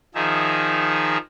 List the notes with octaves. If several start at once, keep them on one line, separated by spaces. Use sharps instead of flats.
D#3 F3 D#4 G#4 E5